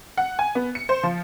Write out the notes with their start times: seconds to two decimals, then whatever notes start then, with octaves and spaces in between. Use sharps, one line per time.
0.17 F#5
0.39 G#5
0.55 B3
0.75 C#7
0.89 C5
1.03 F3